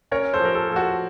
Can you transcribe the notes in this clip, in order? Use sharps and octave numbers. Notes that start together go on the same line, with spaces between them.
C#4 A#4 C#5
A4 C5
F3 A#4
A4
F3 A4
F#4